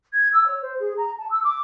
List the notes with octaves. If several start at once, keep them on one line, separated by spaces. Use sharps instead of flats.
G#6
E6
C#5
C5
G#4
A#5
A5
E6
D6